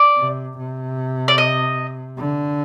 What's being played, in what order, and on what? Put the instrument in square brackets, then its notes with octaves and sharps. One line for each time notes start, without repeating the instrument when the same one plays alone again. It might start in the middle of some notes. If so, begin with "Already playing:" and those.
Already playing: [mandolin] D5
[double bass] C3
C3
[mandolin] D5
D#5
[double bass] D3